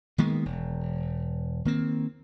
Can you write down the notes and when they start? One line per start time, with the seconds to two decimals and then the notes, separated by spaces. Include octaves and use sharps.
0.18 D#3 G#3 A#3 B3
0.45 E1
1.65 D#3 A#3 C4